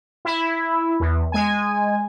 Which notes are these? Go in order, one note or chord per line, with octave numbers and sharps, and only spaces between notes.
E4
E2
G#3 G#5